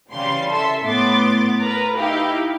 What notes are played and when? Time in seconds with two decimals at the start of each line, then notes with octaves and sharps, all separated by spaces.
0.13 C#3 E3 G3 F5 C6
0.51 A4 E5 C6
0.84 A2 B3 C6 D6 A6
1.61 A#4 B4 A#5
1.97 D#4 E4 G4 F5